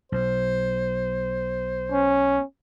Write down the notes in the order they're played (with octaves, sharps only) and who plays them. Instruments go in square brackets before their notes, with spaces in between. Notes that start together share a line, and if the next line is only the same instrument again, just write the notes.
[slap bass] B1 [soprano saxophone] C5
[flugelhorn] C#4